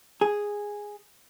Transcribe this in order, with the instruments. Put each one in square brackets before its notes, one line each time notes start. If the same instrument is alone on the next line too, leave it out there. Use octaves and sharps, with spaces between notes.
[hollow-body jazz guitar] G#4